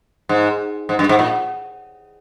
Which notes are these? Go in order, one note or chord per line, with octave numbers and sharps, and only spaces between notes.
G#2
G#2
G2
G#2
A#2